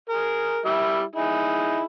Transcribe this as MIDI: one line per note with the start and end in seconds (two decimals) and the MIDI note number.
0.10 0.60 68
0.10 0.60 70
0.66 1.03 55
0.66 1.03 64
0.66 1.03 76
1.16 1.84 63
1.16 1.84 64
1.16 1.84 68